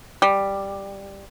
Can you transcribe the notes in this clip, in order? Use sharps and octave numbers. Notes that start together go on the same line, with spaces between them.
G3